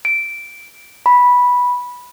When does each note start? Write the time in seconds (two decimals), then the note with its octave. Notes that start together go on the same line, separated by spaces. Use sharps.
0.05 D7
1.06 B5